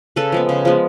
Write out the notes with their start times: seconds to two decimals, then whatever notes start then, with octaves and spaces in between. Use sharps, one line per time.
0.16 C#3 A4 B4
0.32 F3 G#3 B3
0.49 C#3
0.65 F3 G#3 B3